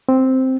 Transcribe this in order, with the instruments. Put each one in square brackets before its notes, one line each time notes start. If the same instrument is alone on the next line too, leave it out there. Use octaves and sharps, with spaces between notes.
[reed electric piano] C4